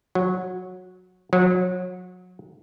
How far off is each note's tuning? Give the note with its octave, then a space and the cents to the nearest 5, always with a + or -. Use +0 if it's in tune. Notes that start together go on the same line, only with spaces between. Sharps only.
F#3 -15
F#3 -30